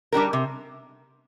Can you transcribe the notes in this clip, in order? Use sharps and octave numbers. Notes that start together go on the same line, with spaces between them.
G3 D4 G4 A#4
C3